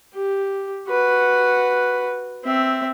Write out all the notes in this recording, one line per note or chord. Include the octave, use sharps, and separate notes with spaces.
G4
F#4 B4
C4 E5